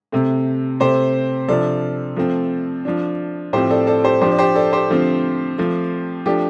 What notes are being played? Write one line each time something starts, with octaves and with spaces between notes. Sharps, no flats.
C3 A3 C4
C3 A3 C4 G4 C5
C3 F3 D4 A4 D5
F3 A3 C4
F3 D4
A2 F3 C4 G4 C5
A4 D5
A4 D5
G4 C5
F3 D4 G4 C5
D5
G4 C5
A4 D5
G4 C5
D3 F3 A3 C4
F3 A3 C4
F3 A3 D4 G4